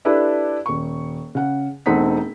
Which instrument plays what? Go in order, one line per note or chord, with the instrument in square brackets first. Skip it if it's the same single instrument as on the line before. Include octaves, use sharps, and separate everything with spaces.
[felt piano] D4 E4 G4 A4 B4
D#1 C#6
C#3 F#5
E1 A3 C4 D#4 F#5 B6